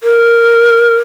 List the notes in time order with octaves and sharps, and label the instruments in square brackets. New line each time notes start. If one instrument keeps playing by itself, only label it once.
[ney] A#4